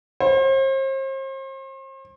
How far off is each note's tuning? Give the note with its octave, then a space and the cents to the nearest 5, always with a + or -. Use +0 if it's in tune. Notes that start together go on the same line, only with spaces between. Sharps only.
C5 +40